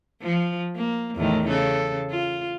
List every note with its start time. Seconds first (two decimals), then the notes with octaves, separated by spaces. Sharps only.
0.22 F3
0.76 A#3
1.16 E2 A2 D#3
1.48 C#3 A4
2.11 F4